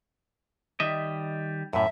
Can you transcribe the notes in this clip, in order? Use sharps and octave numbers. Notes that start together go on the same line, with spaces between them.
D#3 G3 D#5 E5
F#2 A2 E5